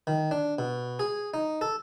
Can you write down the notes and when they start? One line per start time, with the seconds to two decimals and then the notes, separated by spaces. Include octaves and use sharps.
0.07 D#3
0.31 D4
0.59 B2
0.99 G#4
1.34 D#4
1.61 A4